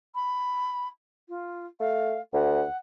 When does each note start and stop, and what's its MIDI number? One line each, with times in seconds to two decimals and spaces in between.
0.15 0.88 83
1.29 1.66 65
1.80 2.15 57
1.80 2.21 77
2.33 2.62 38
2.33 2.77 78